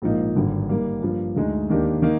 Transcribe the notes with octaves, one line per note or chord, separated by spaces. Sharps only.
A#1 G#2 F3 A#3 D#4
G#1 G2 D3
D#3 G3 A#3
G2 F3 A#3
D2 D3 G#3 D#4
D#2 D#3 A#3 D4 G4
D#3 A#3 D#4